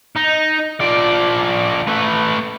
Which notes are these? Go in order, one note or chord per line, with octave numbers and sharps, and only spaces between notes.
D#4
F3 D5
A3 B4